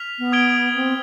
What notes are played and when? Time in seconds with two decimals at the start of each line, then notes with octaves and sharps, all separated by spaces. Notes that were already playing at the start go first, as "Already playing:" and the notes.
Already playing: F6 B6 F7
0.18 B3
0.32 D#6 G#6 D7 G7
0.75 C4